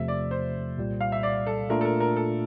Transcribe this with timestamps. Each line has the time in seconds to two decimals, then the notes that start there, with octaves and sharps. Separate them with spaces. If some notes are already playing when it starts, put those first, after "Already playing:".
Already playing: E2 C3 F3 A3 E5
0.08 D5
0.31 C5
0.77 C2 A#2 G3
1.01 F5
1.12 E5
1.23 D5
1.46 A4
1.70 A#2 A3 D4 F4 A#4
1.81 A4
1.85 A#4
2.00 A#4
2.16 A4